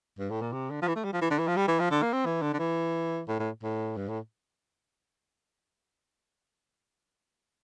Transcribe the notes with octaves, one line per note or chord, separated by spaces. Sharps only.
G2
A2
A#2
C3
D3
F3
E3
A3
G3
F3
E3
D3
E3
F3
G3
E3
F3
D3
A#3
C4
E3
D3
D3
E3
A2
A2
A2
G2
A2